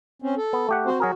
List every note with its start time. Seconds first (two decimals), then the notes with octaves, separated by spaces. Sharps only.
0.22 C4 C#4
0.37 A4
0.53 B3
0.69 A3 G4 F#5
0.86 C4 F#4 C5
1.00 F#3 F#4 G#4 A#4